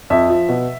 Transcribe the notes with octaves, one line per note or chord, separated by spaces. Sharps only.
F2 E5
F3
B2